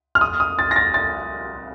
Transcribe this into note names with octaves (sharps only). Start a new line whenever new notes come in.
F6
D#6
D#6
A6
A#6
A6
A6